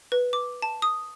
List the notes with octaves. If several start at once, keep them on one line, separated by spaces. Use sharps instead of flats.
B4
D6
A5
D#6